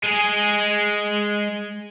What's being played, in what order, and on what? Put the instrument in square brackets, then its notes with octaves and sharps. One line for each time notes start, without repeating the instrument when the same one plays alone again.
[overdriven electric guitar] G#3 G#4